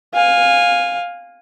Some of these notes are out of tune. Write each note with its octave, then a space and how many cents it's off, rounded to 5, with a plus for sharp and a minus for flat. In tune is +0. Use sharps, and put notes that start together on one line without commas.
F5 +10 G#5 -15